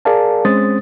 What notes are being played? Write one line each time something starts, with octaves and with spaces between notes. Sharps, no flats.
G#4 A#4 D5 F5 A5
G#3 C4 C#4 C5 D#6 A6